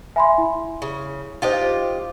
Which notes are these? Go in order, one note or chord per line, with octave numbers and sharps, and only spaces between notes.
E5 G#5 B5 C6
E4
C#3
D#4 F4 G4 C5 D#5